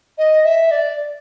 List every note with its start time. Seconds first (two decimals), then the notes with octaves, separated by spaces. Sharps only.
0.18 D#5
0.45 E5
0.71 D5